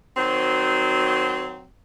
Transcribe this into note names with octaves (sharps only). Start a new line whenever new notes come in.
D#3 F#3 C4 F#4 C5